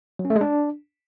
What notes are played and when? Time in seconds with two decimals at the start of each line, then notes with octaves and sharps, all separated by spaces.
0.19 F#3
0.25 C#4
0.30 A3
0.36 G#3
0.41 D4